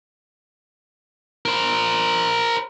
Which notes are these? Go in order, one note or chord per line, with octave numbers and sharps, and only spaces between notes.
A#4 C5